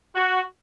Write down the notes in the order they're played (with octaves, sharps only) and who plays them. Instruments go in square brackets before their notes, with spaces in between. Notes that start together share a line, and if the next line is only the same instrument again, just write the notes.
[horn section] F#4